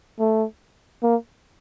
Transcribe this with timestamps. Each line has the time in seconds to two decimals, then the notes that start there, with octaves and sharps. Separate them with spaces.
0.20 A3
1.03 A#3